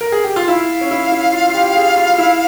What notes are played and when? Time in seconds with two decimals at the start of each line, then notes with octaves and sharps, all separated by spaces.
0.01 A#4
0.12 G#4
0.24 G4
0.36 F4
0.48 E4 F5
0.81 C#4
0.91 E4
1.12 E4
1.33 F4
1.49 F4
1.54 G4
1.70 G4
1.76 G#4
1.97 F4
2.18 E4